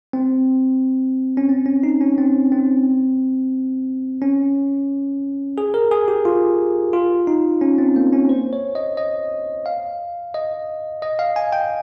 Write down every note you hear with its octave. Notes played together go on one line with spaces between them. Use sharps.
C4
C#4
C4
C#4
D#4
C#4
C4
C4
C#4
G#4
A#4
G#4
G4
F4
F4
D#4
C#4
C4
A#3
C#4
C5
C#5
D#5
D#5
F5
D#5
D#5
F5
G#5
G5